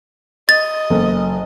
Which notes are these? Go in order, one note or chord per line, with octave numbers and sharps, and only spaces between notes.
D#5 A6
F#1 A4